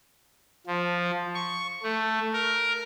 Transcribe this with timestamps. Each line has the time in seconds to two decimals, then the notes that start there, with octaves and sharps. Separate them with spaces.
0.67 F3
1.35 C#6
1.83 A3
2.33 A#4